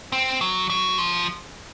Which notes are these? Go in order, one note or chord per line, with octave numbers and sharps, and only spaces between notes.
C4
F#3
F#3
F3